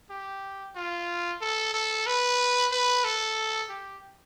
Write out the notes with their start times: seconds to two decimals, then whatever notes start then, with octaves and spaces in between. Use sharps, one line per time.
0.10 G4
0.76 F4
1.41 A4
1.74 A4
2.07 B4
2.72 B4
3.04 A4
3.70 G4